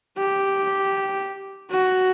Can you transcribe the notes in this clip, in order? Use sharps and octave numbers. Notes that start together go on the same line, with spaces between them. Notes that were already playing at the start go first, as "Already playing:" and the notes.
G4
F#4